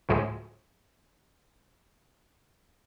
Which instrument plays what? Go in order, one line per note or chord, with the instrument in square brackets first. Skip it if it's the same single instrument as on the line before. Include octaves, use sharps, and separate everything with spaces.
[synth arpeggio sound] D2 A2 F3 F#3 G#3